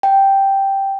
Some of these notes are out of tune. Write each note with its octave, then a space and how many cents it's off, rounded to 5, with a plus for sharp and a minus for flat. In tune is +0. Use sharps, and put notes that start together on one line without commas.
G5 -5